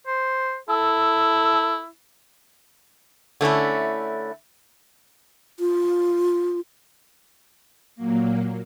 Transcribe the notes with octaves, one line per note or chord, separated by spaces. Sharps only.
C5
E4 A4
D3 A3 C#4 E4
F4
A#2 F#3 A#3